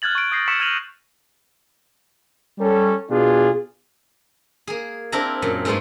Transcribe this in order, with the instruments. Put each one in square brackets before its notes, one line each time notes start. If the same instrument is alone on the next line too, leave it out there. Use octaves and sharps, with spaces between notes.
[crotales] F6 F#6 G#6 A6 F#7
C#6 D7
D#6 G6 A#6 C7 D7
C#6 E6 B6 C#7 D#7 E7
F6 G#6 D#7 F7 F#7
[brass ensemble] G3 C#4 A4
B2 D4 F4 G#4
[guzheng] A#3 G#4
C4 D4 E4 A#4 A#5
F#2 A#2
G#2 G#3 A3 B3 D4 F4